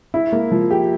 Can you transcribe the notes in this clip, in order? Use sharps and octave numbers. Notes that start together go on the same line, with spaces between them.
E4
A#3
F3
G4